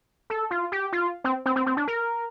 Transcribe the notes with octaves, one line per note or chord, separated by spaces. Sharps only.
A4
F4
G4
F4
C4
C4
C4
C4
D4
A#4